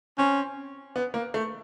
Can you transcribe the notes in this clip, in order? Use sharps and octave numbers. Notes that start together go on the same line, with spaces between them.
C4 C#4
B3
A#3
A3